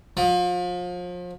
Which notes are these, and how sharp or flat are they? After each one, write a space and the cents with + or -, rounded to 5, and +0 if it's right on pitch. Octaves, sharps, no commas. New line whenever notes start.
F3 +35